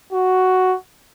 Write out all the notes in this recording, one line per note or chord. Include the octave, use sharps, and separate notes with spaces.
F#4